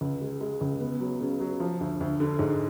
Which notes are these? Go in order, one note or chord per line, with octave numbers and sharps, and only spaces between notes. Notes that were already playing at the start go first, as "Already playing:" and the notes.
C#2
G#3
G#3
C#2
B3
F#3
C#3
F#3
F3
D2
D2
D3
G#2